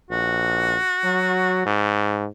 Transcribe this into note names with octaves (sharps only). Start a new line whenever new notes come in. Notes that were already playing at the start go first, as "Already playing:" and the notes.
A#1 F#4
F#3
G#2